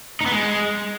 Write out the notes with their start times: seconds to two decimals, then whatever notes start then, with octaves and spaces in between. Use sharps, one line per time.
0.21 D#4
0.26 B3
0.31 G#3